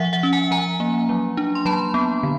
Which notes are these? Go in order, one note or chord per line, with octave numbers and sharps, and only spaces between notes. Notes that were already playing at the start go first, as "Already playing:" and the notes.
Already playing: F3 E5 F#5
E5 F#5
C#4
F#5 G#5
F3 G#5 A#5
A#3
F#3
D4
C6
F#3 A5 B5
B3
D3